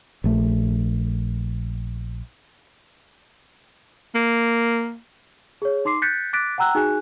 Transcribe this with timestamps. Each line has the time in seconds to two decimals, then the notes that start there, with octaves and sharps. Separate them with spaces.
0.24 A#1 A3
4.15 A#3
5.62 G#4 C#5
5.85 D#4 C6 D6 C7
6.02 F#6 G6 A6 B6 C#7
6.33 D6 F#6 A6 B6 D7
6.58 F#5 G5 A#5 E6 F#6
6.75 D#4 F#4 G#4 G#5 F#6